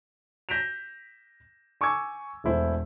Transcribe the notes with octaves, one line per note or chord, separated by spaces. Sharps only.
G6 A#6 B6 D7 E7 F7
G#5 C#6 D6 E6 G#6
E1 E2 A3 E4 C5